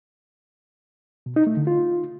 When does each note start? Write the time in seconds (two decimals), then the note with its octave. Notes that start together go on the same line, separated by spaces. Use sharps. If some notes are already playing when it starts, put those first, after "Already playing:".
1.26 B2
1.36 D#4
1.47 A3
1.57 D3
1.67 F4